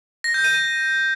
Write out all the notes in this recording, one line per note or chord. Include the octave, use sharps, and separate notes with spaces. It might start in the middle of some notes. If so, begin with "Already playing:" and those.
A#6
G6
D#7